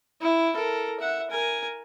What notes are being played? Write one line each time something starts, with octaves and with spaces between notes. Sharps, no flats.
E4
A4 A#4
E5 F#5
A#4 G#5